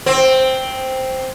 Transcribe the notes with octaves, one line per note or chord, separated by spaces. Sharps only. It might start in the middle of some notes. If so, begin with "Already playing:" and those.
C4